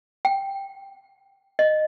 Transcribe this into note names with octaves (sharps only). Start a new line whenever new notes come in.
G5
D#5